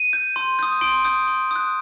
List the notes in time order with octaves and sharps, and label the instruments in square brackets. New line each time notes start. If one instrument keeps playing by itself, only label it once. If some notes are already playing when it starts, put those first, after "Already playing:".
Already playing: [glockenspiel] D#7
G6
C6
D#6 G6
C6 D7
D#6 G6
C6
D#6 F#6